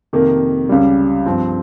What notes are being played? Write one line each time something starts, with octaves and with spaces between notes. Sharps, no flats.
F2 C3 D#3 A#3
C#2 C#3 G3
G2 F3 C4